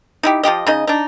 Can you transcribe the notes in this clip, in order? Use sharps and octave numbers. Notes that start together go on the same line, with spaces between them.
D#4 E4 G4
F3 F4 G4 D#5
C#3 D#4 D#5
D4 D#4